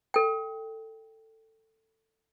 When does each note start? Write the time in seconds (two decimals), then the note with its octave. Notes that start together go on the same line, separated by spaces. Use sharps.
0.14 A4 G5